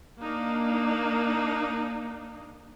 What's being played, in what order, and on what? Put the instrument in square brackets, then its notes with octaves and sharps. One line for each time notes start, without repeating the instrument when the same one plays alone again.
[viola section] A#3 D4 D#4